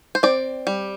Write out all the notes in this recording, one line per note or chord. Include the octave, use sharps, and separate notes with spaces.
C5
C4 D5
G3